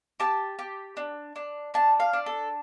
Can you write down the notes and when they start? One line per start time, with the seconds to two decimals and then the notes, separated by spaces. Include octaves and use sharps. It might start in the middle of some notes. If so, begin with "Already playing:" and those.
0.20 G4 A5
0.59 G4
0.97 D4
1.36 D4
1.74 D4 A5
2.00 F5
2.13 D4
2.26 A4